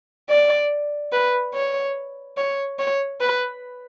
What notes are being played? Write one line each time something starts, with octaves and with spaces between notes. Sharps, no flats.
D5
B4
C#5
C#5
C#5
B4